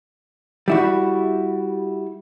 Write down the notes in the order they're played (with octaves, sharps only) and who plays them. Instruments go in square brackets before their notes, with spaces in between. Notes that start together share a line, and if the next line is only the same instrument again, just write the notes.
[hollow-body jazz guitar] G3 E4 F#4